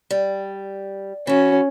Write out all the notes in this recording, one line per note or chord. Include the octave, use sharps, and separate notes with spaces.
G3
E3 C#4 F#4